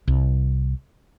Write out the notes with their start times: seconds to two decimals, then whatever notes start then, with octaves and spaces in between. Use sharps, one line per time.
0.08 C2